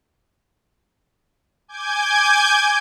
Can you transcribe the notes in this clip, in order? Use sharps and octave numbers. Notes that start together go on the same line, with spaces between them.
G#5 D6 G6 G#6